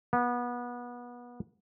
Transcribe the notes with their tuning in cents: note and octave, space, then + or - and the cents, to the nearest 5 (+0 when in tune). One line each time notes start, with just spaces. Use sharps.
B3 -25